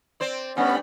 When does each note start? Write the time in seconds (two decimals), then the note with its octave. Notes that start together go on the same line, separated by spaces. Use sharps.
0.20 C4 C5 D5
0.57 G2 G3 A3 B3 C#4